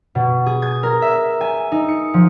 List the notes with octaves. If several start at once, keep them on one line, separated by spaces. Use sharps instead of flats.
B2
G#4
G#6
A#4
E5
G#5
D#4
C#7
F3